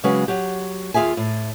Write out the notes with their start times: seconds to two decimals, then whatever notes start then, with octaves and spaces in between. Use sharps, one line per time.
0.04 C#3 F#3 G#3 C#4 F#4 B4
0.28 F#3 G4
0.94 D#2 F4 G#4 E5 G#5
1.17 A2